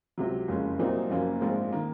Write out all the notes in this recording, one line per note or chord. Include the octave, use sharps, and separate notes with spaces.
C#2 C3 F#3
F#1 F2 C#3 G#3 C#4
C2 A#2 F#3 C4 D#4
F#1 F#2 F3 A#3 C#4
A#1 G#2 F3 G#3 C4
D#3 A#3